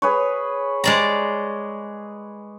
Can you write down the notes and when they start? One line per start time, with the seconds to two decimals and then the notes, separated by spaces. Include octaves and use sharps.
0.02 G#4 B4 C#5
0.84 G#3 D5 A#5